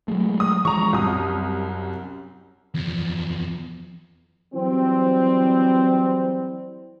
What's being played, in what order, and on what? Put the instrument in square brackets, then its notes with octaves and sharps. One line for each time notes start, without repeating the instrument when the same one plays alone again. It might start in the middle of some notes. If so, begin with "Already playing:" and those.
[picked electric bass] F#3 G#3 A3
[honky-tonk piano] D#6
[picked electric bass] E3 F3 G#3 [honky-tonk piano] A#5 C#6
[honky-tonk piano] C2 D#6 [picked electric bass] F#2
[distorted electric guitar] E2 F3
[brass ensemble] E3 F#3 G3 C4